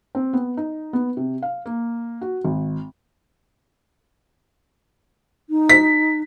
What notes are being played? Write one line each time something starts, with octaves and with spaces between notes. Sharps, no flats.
C4
B3
D#4
B3
C3
F5
A#3
F#4
G#1
D#4
B6